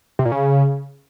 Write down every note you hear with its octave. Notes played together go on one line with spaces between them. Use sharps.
C3
A#2
C#3